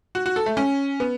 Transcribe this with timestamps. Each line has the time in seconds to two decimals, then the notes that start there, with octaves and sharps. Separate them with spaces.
0.15 F#4
0.26 F#4
0.36 A4
0.46 A3
0.57 C#4
1.00 B3